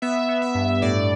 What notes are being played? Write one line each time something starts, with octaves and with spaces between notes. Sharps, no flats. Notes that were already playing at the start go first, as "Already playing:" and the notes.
B3 E5
B3
E5
G2
A2 D5